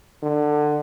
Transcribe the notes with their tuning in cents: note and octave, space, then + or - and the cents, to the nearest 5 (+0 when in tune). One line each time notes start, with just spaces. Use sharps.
D3 +20